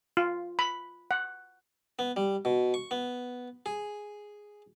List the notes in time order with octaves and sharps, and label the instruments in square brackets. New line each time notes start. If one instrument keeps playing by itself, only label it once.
[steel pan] F4
B5
F#5
[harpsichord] B3
G3
B2
C#6
B3
G#4